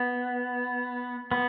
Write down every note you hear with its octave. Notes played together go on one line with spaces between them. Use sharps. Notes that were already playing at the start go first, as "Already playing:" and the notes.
Already playing: B3
B3